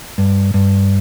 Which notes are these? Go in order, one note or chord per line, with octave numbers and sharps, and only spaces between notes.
G2
G2